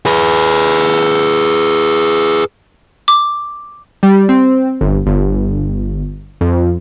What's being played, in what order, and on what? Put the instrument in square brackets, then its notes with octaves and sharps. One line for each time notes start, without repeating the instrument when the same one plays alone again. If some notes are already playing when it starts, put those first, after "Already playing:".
[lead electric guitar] G#4 B4
[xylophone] D6
[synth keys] G3
C4
G1
G1
F2